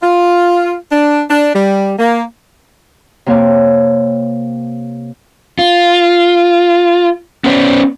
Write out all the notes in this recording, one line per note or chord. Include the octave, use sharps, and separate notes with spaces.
F4
D4
D4
G3
A#3
C3 A#3 C#5 F5 D6
F4
B3 C#4 B4 C5 D5